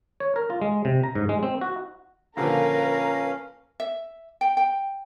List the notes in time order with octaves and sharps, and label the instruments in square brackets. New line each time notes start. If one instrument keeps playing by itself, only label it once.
[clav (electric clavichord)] C#5
A#4
F4
G#3
C3
A#5
G#2
G#3
C4
F#4
[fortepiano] A#2 D3 F3 [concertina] C#4 F5 [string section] A#4 B4 [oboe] A#5
[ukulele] E5
G5
G5